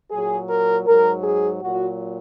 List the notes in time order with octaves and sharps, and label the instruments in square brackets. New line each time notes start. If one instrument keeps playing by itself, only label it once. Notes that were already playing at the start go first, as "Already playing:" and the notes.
[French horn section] A#2 F#3 G#4
A#4
G#2 F#3 A#4
G#4
A#2 F#3 F#4